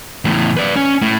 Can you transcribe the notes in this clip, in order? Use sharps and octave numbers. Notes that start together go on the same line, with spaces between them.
E2 A2
B4 D5
C#4
A2